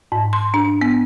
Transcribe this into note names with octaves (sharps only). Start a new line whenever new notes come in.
G#2
C6
D4
B3